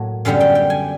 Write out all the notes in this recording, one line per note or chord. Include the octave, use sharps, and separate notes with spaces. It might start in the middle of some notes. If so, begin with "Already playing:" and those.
Already playing: A2 F#3 A#3
F#2 D3 G3 B3 F5
G5
G5
G#5